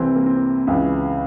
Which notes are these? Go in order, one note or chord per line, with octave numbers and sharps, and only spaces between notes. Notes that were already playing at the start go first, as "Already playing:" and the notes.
Already playing: C2 C3 E3 C4
A#3
C4
C#2 C#3 E3